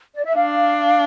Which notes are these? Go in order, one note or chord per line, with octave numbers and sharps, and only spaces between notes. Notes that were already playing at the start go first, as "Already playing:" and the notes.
D5
E5
D4 F5